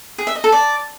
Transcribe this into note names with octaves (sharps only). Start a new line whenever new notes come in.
G#4
E5
D#5
A4
D5